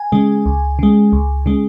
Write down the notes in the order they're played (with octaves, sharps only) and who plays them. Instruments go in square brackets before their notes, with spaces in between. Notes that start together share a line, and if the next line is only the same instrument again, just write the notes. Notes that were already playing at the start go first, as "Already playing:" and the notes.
Already playing: [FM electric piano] G#5
C#3 G#3
C#2
C#3 G#3
C#2
C#3 G#3